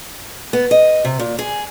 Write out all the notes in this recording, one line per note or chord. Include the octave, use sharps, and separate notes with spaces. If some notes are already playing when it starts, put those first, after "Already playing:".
B3
D#5
C3
A#2
G#4